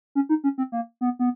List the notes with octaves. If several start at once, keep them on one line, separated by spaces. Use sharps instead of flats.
C#4
D#4
C#4
C4
A#3
B3
B3